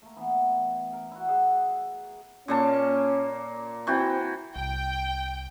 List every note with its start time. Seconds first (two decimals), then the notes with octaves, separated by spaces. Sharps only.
0.02 A3 A#3
0.16 E3 B3
0.93 A#4
1.11 E4 F#4
1.28 G#4 E5 F#5
2.48 A#2 A#3 C#4 A5
3.87 E3 C4 F#4 G5
4.56 C2 G5